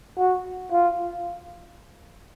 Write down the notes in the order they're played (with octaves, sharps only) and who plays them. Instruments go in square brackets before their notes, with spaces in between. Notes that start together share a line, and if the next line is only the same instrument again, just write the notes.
[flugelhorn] F#4
F4